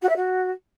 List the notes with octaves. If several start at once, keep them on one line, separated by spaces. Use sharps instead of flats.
F#4
E5
F#4